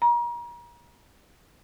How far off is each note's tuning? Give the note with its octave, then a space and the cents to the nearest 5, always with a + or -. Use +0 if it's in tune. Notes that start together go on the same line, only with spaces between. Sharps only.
A#5 +35